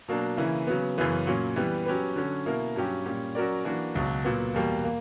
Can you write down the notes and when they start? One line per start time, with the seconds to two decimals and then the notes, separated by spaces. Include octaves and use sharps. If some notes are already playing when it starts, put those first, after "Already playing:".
0.08 B2 F#3 A#3 D4
0.37 C#3 E3 A#3 E4
0.67 C#3 F#3 B3
0.98 F#2 C#3 E3 B3
1.27 A#2 F#3 C#4
1.56 E3 G3 B3
1.86 F#3 C#4 G4 B4
2.16 D3 F#3 C#4
2.46 B2 A#3 E4 A#4
2.76 G2 F#3 C#4 G4
3.06 A#2 G3 C#4
3.35 F#3 C#4 F#4 A#4 D5
3.65 E3 A#3 D4 F#4
3.95 C#2 B2 F#3
4.24 A#2 F#3 B3
4.54 E2 B2 G3 A#3
4.84 A#3